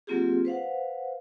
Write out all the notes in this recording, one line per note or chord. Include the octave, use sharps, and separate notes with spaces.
F#3 A#3 C4 F4 G4 G#4
B4 C5 F5 F#5